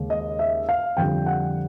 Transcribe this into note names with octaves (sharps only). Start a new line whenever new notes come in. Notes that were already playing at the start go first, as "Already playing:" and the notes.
Already playing: D#2 C#3 G#3
D#5
E5
F5
F2 D3 G3 G5
F#5